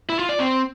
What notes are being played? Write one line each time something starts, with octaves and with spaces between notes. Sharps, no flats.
E4
F4
D5
C4